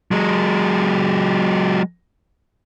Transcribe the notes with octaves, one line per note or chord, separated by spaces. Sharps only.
F#3 G#3